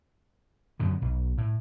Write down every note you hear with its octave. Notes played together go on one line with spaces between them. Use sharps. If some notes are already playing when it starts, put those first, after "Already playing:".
F#2 B2 D3
B1
A2